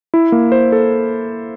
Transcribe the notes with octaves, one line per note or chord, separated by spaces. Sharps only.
E4
A#3
C5
A4